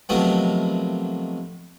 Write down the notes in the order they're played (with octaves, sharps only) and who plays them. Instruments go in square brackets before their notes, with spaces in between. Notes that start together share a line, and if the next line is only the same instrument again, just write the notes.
[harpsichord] C3 D#3 F3 F#3 A3 B3